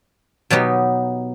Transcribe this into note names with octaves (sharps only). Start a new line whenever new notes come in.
B2 F#3 B3 D#4 G4